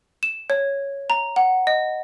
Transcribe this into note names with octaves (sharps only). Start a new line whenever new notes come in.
E7
C#5
A#5
F#5
D#5